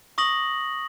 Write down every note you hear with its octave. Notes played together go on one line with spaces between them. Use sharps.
C#6 D#6 A#6 F#7